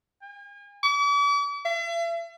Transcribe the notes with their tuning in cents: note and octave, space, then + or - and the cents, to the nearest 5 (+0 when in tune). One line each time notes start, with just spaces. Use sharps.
G#5 -40
D6 -45
E5 +45